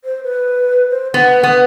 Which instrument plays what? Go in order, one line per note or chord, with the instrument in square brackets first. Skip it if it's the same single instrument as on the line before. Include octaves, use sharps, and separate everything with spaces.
[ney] C5
B4
C5
[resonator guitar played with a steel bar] B3 [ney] F#5
[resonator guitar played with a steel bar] B3